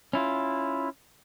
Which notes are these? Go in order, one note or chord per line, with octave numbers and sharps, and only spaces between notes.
C#4 E4 F4